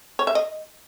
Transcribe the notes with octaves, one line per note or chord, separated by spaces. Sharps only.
C#5
E5
D#5